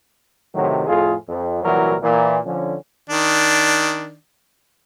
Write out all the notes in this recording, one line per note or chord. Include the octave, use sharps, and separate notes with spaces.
A2 C3 D#3 F#3
F2 A2 F4 G#4
F2
C2 A#2 E3 F#3 F#4 A#4
A#2 E3 A#3
D3 F3 C#4
D#3 D4